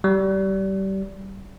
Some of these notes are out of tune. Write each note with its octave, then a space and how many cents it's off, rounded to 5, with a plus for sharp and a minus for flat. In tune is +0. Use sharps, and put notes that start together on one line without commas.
G3 -25